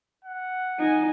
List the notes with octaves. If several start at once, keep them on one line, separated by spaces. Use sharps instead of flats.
F#5
D#4 G#5